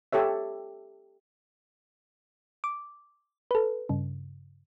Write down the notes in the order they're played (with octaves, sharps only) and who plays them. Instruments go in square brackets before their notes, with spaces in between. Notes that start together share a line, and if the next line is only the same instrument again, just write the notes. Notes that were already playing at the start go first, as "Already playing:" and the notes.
[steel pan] G4 A4 C#5 E5
[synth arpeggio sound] D6
A4 B4
G2 C#3